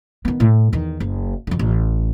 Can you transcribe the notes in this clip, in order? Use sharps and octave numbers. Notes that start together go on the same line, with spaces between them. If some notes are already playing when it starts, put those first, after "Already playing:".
D#3 B3
A2
E2 D#3
F#1
F2 D3
A1